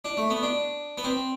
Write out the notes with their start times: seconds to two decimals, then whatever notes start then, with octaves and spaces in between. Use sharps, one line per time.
0.05 D4
0.17 A3
0.30 B3
0.43 D4
0.98 B3
1.04 C4